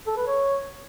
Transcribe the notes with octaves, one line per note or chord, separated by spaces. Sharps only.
A4
B4
C#5